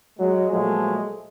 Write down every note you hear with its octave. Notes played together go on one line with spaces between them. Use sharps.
F#3 G#3
A#2 F3 F#3 G#3 A3